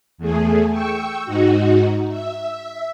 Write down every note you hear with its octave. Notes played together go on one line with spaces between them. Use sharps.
E2 A3 G#4
G5 C#6 E6
G#2 D#4 F#4
E5